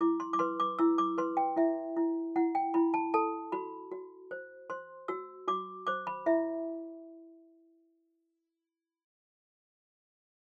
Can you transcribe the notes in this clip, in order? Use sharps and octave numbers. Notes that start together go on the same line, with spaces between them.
E4 D6
C6
D6
B4 C6
D6
E4 E6
D6
B4 C6
G5
E4 E5
E4
E4 F#5
G5
E4 B5
A5
A4 A5
F#4 B5
F#4
C5
C5 C6
F#4 E6
F#4 D6
C5 D6
B5
E4 E5